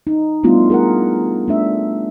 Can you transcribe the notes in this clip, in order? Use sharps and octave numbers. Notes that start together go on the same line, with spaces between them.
D#4
G3 A3 B3 D4 E4 F4
G#4 A#4 F#5
A3 D4 E5